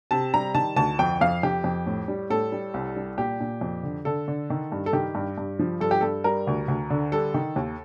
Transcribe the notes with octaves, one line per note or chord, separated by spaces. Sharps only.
C3 A5
G3 A#5
D#3 A5
D2 A5
F2 G5
F2 F5
F2 G4
F2
A2
G3
A2 A4
G3
C2
G3
A#2 G4
A#2
F2
D3
D3 A4
D3
D#3
G2
A4
D#3 G4
G2
G2
F3
G2 A4
G4
G2 A4
G3 A#4
D2
D2
D3
G3 A4
D#3
D#2